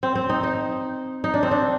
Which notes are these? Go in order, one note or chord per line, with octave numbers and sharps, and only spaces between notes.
C4
C4
D#4
D#4
D#4
D4
C4
D4